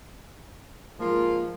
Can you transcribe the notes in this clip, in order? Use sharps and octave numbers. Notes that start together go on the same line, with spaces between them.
G#2 F3 A#3 F4